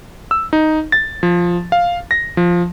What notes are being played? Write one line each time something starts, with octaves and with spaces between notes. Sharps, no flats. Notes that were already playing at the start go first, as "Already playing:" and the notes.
E6
D#4
A6
F3
F5
A#6
F3